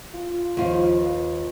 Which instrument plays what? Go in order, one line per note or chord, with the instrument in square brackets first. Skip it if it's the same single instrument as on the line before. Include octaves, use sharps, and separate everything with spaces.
[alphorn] F4
[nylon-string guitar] D#2 F4 [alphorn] F3
[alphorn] B4